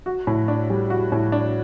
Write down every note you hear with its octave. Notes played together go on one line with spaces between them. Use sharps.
F#4
A2
D4
G3
F#4
A2
D4